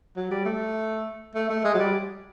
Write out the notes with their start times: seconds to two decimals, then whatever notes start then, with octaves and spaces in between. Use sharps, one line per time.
0.16 F#3
0.31 G3
0.45 A3
1.35 A3
1.49 A3
1.64 G#3
1.74 F#3
1.79 G3